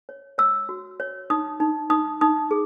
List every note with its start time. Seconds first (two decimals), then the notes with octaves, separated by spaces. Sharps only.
0.09 C#5
0.38 C#5 E6
0.69 F#4
1.00 C#5
1.30 D#4 D#6
1.60 D#4
1.90 D#4 D#6
2.21 D#4 D#6
2.51 G#4